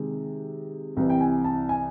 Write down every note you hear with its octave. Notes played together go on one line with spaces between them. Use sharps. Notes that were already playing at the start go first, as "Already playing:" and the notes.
Already playing: C3 D#3 G#3
C2 C3 E3
G5
G#5
A5
G#5